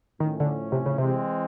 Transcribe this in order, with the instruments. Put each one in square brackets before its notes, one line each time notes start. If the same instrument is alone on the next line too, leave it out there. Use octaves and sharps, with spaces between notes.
[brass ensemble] A2 F3 A3 C#4 [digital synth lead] D#3
[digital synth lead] D3
C3
C#3
[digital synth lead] C3 [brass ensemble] E3 G#3 C4